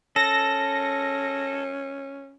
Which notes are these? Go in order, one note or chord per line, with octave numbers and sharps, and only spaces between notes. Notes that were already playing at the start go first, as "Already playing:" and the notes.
C#4 A4 A#6